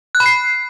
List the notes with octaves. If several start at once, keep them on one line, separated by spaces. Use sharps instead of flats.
F#6
B5
C7